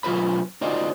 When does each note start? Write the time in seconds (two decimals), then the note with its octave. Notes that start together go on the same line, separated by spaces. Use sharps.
0.03 B2 F#3 F4 B4 C5 B5
0.61 D#4 F4 F#4 C5 D5 D#5